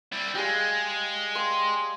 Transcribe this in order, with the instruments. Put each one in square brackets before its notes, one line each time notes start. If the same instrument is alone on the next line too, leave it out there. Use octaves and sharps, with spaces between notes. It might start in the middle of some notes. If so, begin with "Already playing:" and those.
[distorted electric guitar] G3 E4
[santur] G3 G#4 F5 [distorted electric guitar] G#3
[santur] F5 G5 C6